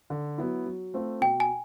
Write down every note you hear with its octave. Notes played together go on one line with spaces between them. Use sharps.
D3
F#3 B3 E4
F#3
A3 C4 F4 A4
B2 G5
G#5